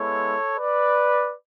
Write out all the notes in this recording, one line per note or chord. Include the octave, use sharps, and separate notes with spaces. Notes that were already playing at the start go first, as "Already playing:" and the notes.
Already playing: G#3 B3 E4 A4 C#5
B4 D5